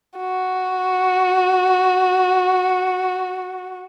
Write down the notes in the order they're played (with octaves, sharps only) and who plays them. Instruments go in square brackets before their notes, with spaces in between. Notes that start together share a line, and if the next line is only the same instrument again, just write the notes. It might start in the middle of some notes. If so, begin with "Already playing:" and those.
[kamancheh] F#4